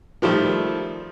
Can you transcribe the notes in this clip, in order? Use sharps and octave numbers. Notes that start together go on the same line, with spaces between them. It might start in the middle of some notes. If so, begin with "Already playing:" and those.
D#3 F3 G3 A3